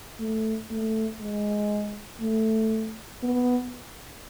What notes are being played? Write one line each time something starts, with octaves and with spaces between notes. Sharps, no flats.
A3
A3
G#3
A3
B3